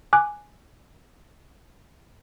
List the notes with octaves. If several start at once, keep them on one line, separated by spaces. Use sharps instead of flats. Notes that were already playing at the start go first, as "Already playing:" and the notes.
G#5 D6 F#6